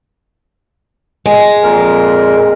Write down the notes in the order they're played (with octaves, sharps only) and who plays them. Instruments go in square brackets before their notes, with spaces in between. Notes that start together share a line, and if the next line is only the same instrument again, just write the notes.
[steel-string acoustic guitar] G#3
[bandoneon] F2 A#2 A#4